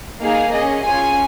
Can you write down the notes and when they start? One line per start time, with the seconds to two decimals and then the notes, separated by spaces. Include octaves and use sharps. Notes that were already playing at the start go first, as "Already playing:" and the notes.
0.21 A#3 D#4 G#4 F5
0.53 C#4 G#4 D#5
0.85 C#4 F4 G#4 G#5